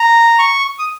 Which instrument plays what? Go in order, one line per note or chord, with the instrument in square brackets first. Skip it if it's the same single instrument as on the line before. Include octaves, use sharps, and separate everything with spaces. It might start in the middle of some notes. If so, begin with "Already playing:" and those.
Already playing: [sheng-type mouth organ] A#5
C#6
D#6